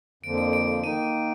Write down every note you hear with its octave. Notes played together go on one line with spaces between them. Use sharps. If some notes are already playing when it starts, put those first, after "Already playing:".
F2 D3 F3 A#3 D7
D7
D7
D#3 A#3 D#4 D#7